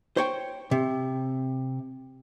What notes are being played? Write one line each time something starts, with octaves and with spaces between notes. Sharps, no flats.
C5 C#5 G5
C3